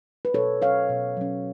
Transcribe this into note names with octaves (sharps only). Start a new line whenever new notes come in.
B4
B2 A4 C#5
F#3 C#4 C#5 F5
B2
F#3 C#4